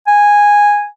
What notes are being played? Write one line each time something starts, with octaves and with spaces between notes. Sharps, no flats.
G#5